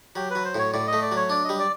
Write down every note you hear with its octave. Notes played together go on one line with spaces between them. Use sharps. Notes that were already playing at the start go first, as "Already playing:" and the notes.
F#3 G4
F#3 B4
C5
A2 C#5
A2 D5
D#5
A3
D5
F#3 C#5
D4 D5
G3 D#5
D5